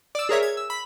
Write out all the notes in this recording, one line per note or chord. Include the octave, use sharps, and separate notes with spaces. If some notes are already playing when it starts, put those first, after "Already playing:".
D5 E6
G#4 A#4 C#5 E5
G#6
E6
B5